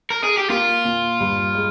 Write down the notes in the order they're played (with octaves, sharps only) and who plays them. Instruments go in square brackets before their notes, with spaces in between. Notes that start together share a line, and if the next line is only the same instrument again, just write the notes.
[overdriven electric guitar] A#4
G#4
G4
[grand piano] A#3 [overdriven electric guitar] F4
[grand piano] A#2
G2
G#3